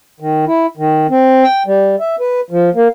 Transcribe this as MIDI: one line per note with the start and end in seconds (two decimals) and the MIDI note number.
0.20 0.45 51
0.47 0.66 64
0.77 1.07 51
1.10 1.44 60
1.44 1.63 79
1.66 1.96 55
2.00 2.16 76
2.20 2.41 71
2.51 2.70 53
2.75 2.88 58